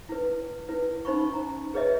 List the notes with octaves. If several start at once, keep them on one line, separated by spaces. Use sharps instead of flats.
E4 B4
E4 B4
C#4 D#4 C5 B5 C#6
A#5
G#4 B4 C#5 D#5 E5